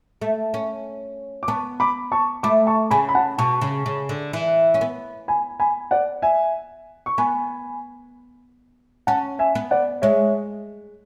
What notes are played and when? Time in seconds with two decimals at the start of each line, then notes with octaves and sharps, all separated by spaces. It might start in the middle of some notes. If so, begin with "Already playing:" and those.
0.22 A3
0.54 C#4
1.43 D6
1.48 B3 A5 C#6
1.80 B5 D6
2.12 A5 C#6
2.43 A3 B5 D6
2.67 A5 C#6
2.91 C#3 G#5 B5
3.09 B5
3.15 F#5 A5
3.38 B2 A5 C#6
3.61 C#3
3.86 C#3
4.09 D3
4.33 E3
4.74 C#4
4.81 B3
5.28 G#5 B5
5.60 G#5 B5
5.91 D5 F#5
6.22 E5 G#5
7.06 C#6
7.18 B3 G#5 B5
9.07 C#4 F#5 A5
9.39 E5 G#5
9.55 B3
9.71 D5 F#5
10.02 G#3 C#5 E5